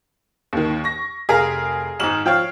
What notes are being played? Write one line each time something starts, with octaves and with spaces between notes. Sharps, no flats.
D#2 D#3
C#6 A#6
F1 G#4 A#4 F5 A#5 B6
G#1 G#2 F6 E7 F#7
F3 C#5 F5 G5